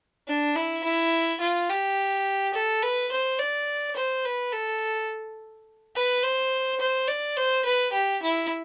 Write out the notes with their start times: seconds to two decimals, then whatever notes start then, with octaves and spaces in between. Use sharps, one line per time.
0.28 D4
0.56 E4
0.83 E4
1.41 F4
1.69 G4
2.54 A4
2.82 B4
3.11 C5
3.39 D5
3.96 C5
4.25 B4
4.53 A4
5.95 B4
6.23 C5
6.80 C5
7.07 D5
7.37 C5
7.65 B4
7.93 G4
8.22 E4